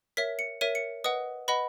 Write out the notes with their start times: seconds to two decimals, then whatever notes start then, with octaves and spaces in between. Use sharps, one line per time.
0.17 A#4 C#5 E5 B6
0.39 C#7
0.61 A#4 C#5 E5 D#7
0.75 C#7
1.04 B4 D#5 F#5 D#6
1.48 B4 D#5 F#5 B5